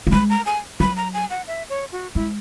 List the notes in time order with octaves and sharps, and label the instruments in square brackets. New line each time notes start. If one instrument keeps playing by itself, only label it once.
[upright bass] F#3
[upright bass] G#3 [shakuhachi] B5
[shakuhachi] A#5
G#5
[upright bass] F#3 [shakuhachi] B5
[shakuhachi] A#5
G#5
F#5
E5
C#5
F#4
[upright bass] G#3 [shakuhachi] E4